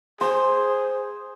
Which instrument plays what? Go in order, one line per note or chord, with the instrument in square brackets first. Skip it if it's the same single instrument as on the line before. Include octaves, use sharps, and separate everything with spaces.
[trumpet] G#4 [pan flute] C5 [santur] C6